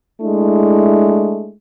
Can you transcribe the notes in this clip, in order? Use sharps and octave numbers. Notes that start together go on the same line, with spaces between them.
G#3 A3 D4 E4